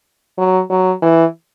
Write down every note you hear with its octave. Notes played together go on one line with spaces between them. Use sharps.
F#3
F#3
E3